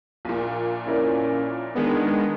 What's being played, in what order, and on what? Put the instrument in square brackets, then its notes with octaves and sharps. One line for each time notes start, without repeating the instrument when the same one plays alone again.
[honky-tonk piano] A#1 A#2
[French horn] C#4 [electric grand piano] E4 A#4 D5
[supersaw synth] D#3 G#3 B3 [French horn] D4